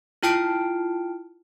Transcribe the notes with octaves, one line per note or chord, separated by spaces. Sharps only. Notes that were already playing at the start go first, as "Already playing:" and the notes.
E4 F4 G5 A5 F6 D7